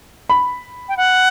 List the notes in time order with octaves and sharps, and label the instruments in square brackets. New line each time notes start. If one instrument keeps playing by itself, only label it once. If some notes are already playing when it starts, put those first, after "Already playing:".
[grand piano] B5
[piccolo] G5
F#5